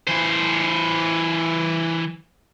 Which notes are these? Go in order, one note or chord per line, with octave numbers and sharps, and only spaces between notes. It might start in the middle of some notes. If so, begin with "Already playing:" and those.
E3 C5